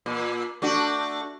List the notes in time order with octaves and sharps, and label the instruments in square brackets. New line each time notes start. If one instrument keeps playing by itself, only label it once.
[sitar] A#2
A3 D4 F#4